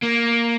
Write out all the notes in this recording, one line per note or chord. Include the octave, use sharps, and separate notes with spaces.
A#3